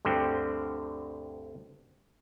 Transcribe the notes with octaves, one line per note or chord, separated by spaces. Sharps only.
D2 G2 D3 C4 G5